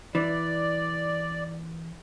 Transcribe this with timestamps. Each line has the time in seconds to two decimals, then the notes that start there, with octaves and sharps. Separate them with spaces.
0.15 E3 D5